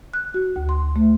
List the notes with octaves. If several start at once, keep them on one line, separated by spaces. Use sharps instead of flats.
F#6
F#4
D2
C6
A3